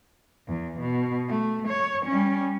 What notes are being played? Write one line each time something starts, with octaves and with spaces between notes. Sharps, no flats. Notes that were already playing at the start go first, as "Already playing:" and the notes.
E2
B2
A3
C#5
G3 C#4